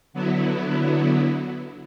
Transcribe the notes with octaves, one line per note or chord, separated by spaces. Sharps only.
D3 F#3 B3 E4